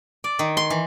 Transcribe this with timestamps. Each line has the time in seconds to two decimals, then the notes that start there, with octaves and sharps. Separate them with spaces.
0.24 D5
0.39 D#3
0.57 C6
0.70 E3